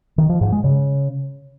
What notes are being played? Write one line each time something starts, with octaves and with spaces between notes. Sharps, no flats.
D#3
F3
G#2
G#3
C#3